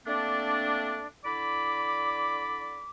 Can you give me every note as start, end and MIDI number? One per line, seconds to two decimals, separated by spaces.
0.06 1.06 57
0.06 1.06 58
0.06 1.06 60
0.06 1.06 62
1.24 2.90 50
1.24 2.90 64
1.24 2.90 74
1.24 2.90 83
1.24 2.90 86